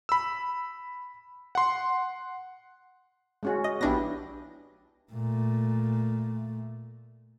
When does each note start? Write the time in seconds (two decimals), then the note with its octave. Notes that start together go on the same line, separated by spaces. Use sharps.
0.09 B5 E6
1.55 F#5 C6
3.43 G#3 C#4 F#4
3.64 D#5
3.81 A#1 B3 D4 E4 G4 A#6
5.12 A#2 A3